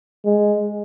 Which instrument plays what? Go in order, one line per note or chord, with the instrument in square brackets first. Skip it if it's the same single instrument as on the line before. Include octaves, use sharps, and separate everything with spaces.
[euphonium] G#3